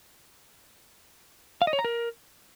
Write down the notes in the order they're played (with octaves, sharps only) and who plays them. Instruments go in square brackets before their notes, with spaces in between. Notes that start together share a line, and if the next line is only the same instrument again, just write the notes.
[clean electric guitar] F5
D#5
C#5
A#5
A#4